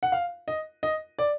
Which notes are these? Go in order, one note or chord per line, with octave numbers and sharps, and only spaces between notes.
F#5
F5
D#5
D#5
D5